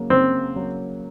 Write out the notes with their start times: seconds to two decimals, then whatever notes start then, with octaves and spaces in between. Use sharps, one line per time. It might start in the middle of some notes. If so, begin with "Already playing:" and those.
Already playing: C#3 F#3 A#3
0.10 C#3 C4
0.56 F#3 A#3